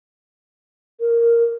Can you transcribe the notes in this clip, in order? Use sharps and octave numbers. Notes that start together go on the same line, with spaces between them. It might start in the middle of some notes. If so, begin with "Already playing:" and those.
A#4